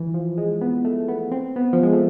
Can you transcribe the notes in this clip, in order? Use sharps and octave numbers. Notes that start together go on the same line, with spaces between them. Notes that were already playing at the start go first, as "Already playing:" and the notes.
Already playing: E3
F3
G#3
B3
A3
B3
C4
B3
F3
G#3
A3